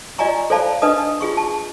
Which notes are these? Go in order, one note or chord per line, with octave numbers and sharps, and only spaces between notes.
F4 D5 D#5 G#5 A#5 C#6
A4 C5 D5 F5 A5 B5
D4 B4 D#5 A5 D#6
F4 G#4 C#6
A5